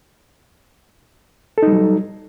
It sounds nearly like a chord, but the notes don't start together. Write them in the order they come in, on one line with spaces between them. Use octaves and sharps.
A4 D#4 G3 F#3